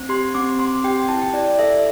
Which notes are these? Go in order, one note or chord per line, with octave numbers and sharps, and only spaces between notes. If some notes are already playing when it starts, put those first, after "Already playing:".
Already playing: C4
G4 C6
C4 D6
C4 C6
G4 G5
E4 A5
G5
E4 D5
D5
A4 E5